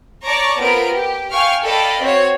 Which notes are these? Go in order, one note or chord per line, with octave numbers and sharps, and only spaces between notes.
C#5 D5 A5 A#5 C#6 D6
B3 C4 F4 A#4 B4 D7
G4
F5 G5 G#5 C#6 F6
A4 D5 D#5 F5 G5 B5
C4 F#4 C#5